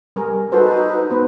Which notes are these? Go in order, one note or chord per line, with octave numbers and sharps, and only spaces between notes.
G3 G#4 A#4
D#4 F#4 A4 B4 C5
B3 B4 C5